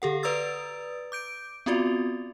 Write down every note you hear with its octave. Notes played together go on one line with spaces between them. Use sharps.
D3 G4 A4 F#5
B4 D5 A#5 D#6 E6 A6
D6 G6 D7
B3 C4 F4 F#4 D5